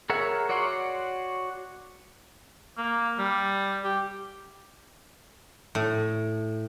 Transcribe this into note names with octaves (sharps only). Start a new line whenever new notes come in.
G#4 A#4 C#5 E5 F#5
F#4 C#5 D5 F#5 C6
A#3
G3
G4
A2